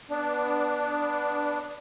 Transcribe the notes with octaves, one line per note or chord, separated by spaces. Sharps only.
B3 D4